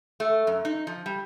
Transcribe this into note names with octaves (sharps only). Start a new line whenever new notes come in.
A3
F#2
D#4
F3
G3